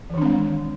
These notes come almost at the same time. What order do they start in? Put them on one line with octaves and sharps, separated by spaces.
E3 D#3 D4 C4 G#3